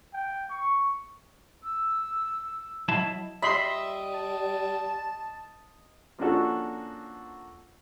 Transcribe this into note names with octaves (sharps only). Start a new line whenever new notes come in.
G5
C#6
E6
F#3 E4 D#5 A5
G3 D#5 E5 B5 C6
A5
F3 A#3 C#4 D4 F#4 A4